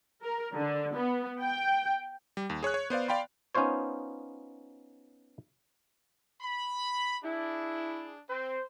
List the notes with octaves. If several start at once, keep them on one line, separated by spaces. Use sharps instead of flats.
A#4
D3
B3
G5
G3
D#2
G#4 C#5 C#6 F#6
C#5
B3 C5 D5 F5
D5 F5 G5 B5 C6
B3 C#4 D#4 F4 C5 C#5
B5
D4 E4 G#4
C4 C5